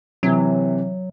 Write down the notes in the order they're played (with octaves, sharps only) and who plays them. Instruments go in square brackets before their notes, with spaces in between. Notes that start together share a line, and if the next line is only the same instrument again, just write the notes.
[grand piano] C3 E3 [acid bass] F#3